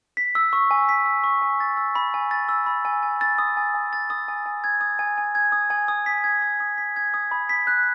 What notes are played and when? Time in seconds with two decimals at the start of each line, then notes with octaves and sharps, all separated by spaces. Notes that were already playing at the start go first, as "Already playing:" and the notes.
0.17 B6
0.35 E6
0.53 C#6
0.71 G#5
0.89 B6
1.06 E6
1.24 C#6
1.42 G#5
1.60 A6
1.77 E6
1.95 B5
2.14 G#5
2.31 A6
2.49 E6
2.66 B5
2.85 G#5
3.03 G#5
3.21 A6
3.38 D#6
3.57 G#5
3.75 G#5
3.93 A6
4.10 D#6
4.28 G#5
4.46 G#5
4.64 G#6
4.81 D#6
4.99 G#5
5.18 G#5
5.35 G#6
5.52 D#6
5.70 G#5
5.88 D#6
6.06 B6
6.24 G#6
6.42 D#6
6.60 D#6
6.78 B6
6.96 G#6
7.14 D#6
7.31 B5
7.49 B6
7.67 F#6